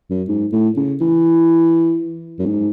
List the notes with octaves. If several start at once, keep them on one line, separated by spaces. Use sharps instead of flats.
F#2
G#2
A2
C#3
E3
F#2
G#2